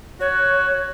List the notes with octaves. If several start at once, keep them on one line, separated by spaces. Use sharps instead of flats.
F#4 C#5